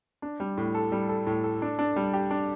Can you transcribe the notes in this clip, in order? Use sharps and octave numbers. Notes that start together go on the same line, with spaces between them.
D4
G3
A2
A4
G3
A4
A2
A4
D4
D4
G3
G4
D4